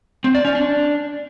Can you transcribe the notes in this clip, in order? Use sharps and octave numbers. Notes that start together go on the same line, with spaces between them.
C4
D5
C#4
D4